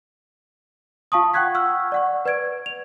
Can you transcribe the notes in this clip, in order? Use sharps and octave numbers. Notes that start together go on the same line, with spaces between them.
F4 F5 A5 C#6 D#6
F#5 G5 C#6 F#6 G#6 B6
F#5 C#6 E6 F6
D5 F#5 C#6
B4 D5 G#6 D7
F7